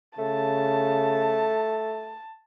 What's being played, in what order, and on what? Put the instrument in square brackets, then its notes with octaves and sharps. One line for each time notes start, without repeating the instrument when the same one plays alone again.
[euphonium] C#3 [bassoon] A3 [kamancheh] A5